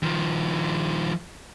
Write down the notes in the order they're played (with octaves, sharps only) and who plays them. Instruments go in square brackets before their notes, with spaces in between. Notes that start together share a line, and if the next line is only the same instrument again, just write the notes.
[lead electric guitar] D#3 F3